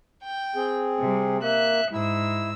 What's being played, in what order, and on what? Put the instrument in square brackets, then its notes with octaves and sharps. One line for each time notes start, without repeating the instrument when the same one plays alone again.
[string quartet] G5
[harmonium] C4 G#4
[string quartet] C3 G3
[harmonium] A#3 [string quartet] E5 F#6
[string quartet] G#2 E6 [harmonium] E4